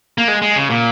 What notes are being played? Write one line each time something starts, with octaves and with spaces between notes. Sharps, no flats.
A#3
G#3
G#3
C#3
A#2